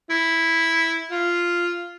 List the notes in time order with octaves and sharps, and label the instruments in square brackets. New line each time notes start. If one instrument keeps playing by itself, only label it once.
[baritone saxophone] E4
F4